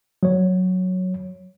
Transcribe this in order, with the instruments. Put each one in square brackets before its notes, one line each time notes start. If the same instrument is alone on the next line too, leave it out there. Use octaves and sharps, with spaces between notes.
[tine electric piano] F#3 C#5